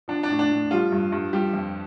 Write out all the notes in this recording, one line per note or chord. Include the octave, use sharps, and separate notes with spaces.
F3 D4
D4
A2
D4
A2
F3 G3 F4
G2
G2
F3 G3 G4
F2